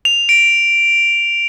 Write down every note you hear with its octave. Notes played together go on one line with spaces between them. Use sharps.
F7
D7